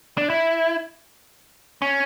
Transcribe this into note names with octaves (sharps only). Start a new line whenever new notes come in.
D4
E4
C#4